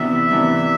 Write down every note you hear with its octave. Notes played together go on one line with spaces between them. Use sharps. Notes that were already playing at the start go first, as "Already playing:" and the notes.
Already playing: C3 E3 B3 D4 E5
C3 E3 B3 D4